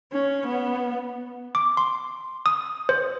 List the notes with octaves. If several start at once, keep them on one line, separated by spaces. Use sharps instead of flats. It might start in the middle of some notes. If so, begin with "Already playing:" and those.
C#4
B3
D6
C6
D#6
C5